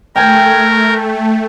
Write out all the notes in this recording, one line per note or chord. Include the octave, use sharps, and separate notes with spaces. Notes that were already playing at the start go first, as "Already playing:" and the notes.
A3 A#4 G5 G#5